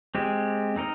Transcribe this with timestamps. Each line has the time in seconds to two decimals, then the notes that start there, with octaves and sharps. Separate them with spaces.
0.15 G#3 C4 G4
0.76 C4 D#4 A#4 D#5